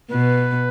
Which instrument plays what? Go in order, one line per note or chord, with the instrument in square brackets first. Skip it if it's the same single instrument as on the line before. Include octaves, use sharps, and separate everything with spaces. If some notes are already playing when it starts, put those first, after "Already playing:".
[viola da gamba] B2 [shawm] B4